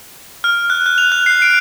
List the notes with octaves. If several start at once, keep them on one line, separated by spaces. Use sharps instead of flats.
F6
F#6
F#6
F7
F#6
C7
D7